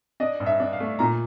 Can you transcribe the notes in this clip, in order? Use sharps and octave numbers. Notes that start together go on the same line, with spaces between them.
D4 D#5
G2
E5
D4
F5
A3
A#2 A#5